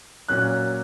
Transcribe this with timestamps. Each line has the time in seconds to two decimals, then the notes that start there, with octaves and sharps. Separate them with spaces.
0.28 A#2 F#3 C#4 F#6